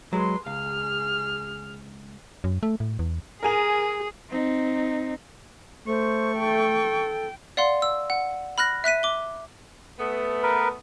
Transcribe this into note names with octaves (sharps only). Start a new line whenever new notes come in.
F#3 G#3 B4 C6
C#2 G#4 F5 F6
F#2
A3
A2
E2
G#4 A#4 G#5 F7
C4 D#4
A3 C5 C#6
A4 G5
D5 F5 F#5 C6
E6
F#5
B5 F6 F#6 A#6
E5 F#6 B6 D#7
D6 G7
A3 B3
A#4 B4